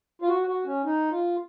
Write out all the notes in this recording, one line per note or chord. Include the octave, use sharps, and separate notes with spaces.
F4
F#4
F#4
C#4
D#4
F4